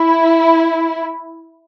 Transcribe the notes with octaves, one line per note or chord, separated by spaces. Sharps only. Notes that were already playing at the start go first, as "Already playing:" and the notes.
Already playing: E4